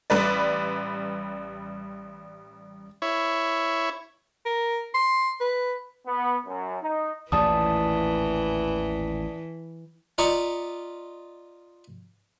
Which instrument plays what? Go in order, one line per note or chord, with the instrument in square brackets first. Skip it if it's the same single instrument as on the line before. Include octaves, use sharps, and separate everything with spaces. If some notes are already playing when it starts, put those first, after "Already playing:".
[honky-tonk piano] A1 G3 B4 D5
[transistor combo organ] E4 C#5
[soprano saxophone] A#4
C6
B4
[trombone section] B3
F#2
D#4
[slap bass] A1 D#2 A#2 [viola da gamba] E3 [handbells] D5 A5 D#6
[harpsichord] F4 D5 D#5 A#5 B5 C#6